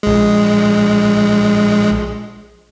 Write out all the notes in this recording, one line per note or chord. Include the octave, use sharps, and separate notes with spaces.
A#1 G#3